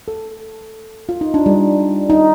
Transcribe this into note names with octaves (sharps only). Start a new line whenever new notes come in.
A4
F4
D#4
D4
G3
D#4